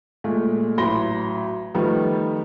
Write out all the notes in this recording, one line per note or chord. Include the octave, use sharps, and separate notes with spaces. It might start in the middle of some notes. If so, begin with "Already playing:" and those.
A#2 G#3 A3
A1 F#3 B5 C6 A#6 G7
D#3 F3 G3 A3 B3